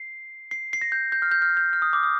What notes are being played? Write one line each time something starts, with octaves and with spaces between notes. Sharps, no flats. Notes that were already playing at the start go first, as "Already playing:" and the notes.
Already playing: C7
C7
C7
A#6
G6
G6
F6
G6
F6
G6
F6
D#6
D6
D#6